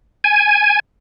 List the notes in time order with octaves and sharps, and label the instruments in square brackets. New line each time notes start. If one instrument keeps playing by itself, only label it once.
[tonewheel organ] G#5